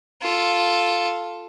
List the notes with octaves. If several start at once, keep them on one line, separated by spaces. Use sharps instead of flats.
F4 A4